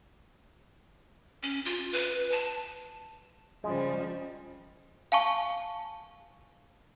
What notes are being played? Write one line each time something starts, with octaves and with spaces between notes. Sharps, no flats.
C#4
F4
B4
A5
C#3 F3 G3 G#3
F5 G#5 A5 C#6